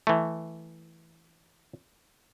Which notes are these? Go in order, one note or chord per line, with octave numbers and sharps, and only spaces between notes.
E3 A3